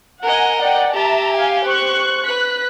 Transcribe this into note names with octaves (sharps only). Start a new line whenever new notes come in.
A#4 D#5 F#5 G#5
D5 F#5 G5
G4 E5 A5 A#5
F5 G#5
C5 C#6 F#6
B4 F#6 B6